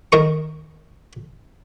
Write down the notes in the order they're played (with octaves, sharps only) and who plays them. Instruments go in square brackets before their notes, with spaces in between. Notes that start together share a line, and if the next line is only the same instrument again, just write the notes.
[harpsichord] D#3 A#4 A#5 C#6